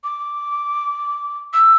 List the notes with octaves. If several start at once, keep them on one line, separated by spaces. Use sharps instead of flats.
D6
E6